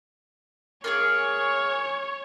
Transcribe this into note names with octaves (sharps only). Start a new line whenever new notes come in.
A#3 F4 G#4 C#5